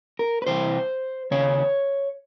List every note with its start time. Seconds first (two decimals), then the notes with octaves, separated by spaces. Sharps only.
0.19 A#4
0.42 B4
0.47 C2 C3 E3 C5
1.31 D#2 C#3 C#5